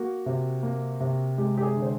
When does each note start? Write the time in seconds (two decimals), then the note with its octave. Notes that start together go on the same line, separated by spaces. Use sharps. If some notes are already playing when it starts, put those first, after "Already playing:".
Already playing: A#3 F#4
0.26 C3
0.63 A#3
1.00 C3
1.38 G#3 G4
1.58 G4
1.63 G#4
1.75 D3
1.82 C5